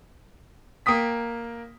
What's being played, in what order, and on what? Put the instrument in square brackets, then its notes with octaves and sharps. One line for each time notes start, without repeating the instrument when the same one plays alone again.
[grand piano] A#3 G5 D#6 B6